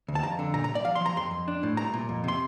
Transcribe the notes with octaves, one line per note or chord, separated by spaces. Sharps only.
D2
A5
F2 A#5
D3
A#2 A#5
A#5
C2
D5
F3 F5
C6
F3 A#5
F2 C6
F2
D4
A2
C2 A#5
A#2
F2
C3 C6